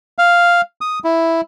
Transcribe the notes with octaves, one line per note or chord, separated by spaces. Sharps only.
F5
D#6
E4